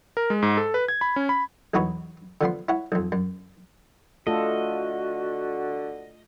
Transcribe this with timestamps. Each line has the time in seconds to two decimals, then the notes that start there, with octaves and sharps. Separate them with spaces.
0.17 A#4
0.30 G#3
0.42 G#2
0.57 A4
0.74 B4
0.88 G#6
1.01 B5
1.16 C#4
1.29 B5
1.74 B1 E2 D#4 F#4 B4 C#5
2.41 D3 F3 B3 C6
2.69 E4 C#5 F#5
2.92 B1 F2
3.12 F#2
4.27 D3 A3 F4 F#4 A4 D#5